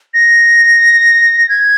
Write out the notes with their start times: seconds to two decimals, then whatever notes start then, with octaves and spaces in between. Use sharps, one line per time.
0.14 A#6
1.49 G#6